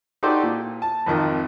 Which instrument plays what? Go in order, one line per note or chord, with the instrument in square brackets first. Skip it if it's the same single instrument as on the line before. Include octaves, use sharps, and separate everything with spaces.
[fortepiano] D#4 F#4 G4 A4 C5 D5
A#2
A5
G#1 F2 D#3 A#4